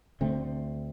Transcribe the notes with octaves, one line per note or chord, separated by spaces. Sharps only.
D2 D3 A3 C4